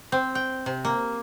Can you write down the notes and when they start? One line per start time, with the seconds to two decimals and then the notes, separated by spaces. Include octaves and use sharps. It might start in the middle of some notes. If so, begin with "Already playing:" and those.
0.12 C4
0.35 G5
0.66 C3
0.85 A#3